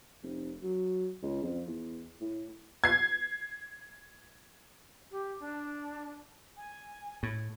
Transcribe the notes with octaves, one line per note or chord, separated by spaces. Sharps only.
F1
F#3
C#2
F2
E2
A2
G#6 C7
G4
D4
G#5
A2